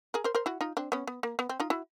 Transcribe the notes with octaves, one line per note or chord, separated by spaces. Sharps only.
G#4 A#4
A#4 C5
A#4 C5
E4 F#4
D#4 F4
C4 D4
B3 C#4
B3
A#3
B3
C4
D#4 F4
E4 F#4